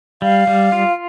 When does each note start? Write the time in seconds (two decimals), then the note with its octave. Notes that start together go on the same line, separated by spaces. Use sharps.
0.22 G3 F5
0.47 G3
0.72 F4